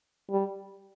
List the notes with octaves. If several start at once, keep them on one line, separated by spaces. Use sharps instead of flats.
G3